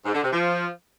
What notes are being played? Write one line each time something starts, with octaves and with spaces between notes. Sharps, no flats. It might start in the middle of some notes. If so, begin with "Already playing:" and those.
G#2
D3
C3
F3